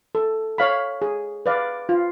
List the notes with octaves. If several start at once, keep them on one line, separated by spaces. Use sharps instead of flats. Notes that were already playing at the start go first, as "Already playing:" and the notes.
A4
C#5 F5 B5
G#4
B4 D5 F5
F4